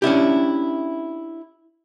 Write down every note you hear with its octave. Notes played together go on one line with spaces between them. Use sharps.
C#4 D4 E4 G4